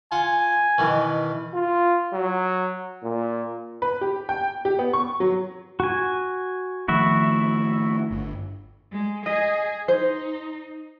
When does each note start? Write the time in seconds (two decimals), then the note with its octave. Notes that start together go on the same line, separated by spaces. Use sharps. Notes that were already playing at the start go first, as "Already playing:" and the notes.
0.12 F4 F#5 G#5
0.78 B2 D#3 E3
1.54 F4
2.13 F#3
3.03 A#2
3.82 B4
4.01 G4
4.29 G5
4.65 G4
4.79 B3
4.93 C#6
5.20 F#3
5.80 F#4 G#5
6.88 D#3 F3 A3 E4 F#4 E5
8.11 G1
8.92 G#3
9.26 G#4 D#5
9.88 D#4 C5